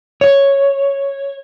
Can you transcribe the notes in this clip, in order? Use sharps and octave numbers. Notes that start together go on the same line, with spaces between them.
C#5